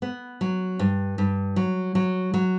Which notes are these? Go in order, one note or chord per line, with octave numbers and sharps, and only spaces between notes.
B3
F#3
G2
G2
F#3
F#3
F#3